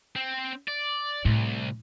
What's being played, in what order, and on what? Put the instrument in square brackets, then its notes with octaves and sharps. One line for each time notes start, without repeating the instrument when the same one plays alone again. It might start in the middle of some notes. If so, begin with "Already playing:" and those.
[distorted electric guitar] C4
D5
[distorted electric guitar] C2 [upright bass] A2